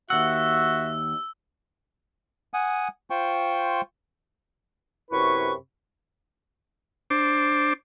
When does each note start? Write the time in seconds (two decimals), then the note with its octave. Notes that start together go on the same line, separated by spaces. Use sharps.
0.10 D#2 F#4 E5 F#5 E6
2.54 F#5 G#5 D#6
3.10 F4 C5 G5 C#6
5.11 F#2 C3 E4 B4 B5 C#6
7.10 D4 C5 D6